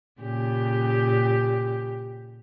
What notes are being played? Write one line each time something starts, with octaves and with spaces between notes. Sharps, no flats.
A#2 C#3 G4